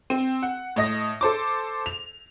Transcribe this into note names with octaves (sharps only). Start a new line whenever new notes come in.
C4
F#5
A2 D#5 A#6
A4 C5 D6
F7